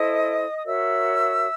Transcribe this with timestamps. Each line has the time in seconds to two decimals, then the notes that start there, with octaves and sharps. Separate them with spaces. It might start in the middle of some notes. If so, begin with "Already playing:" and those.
Already playing: E4 A4 C5 D#5 D#6
0.58 D#6
0.65 F#4 A#4 C#5 E5 E6